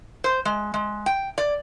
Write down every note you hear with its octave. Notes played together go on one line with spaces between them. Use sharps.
C5
G#3
G#3
G5
D5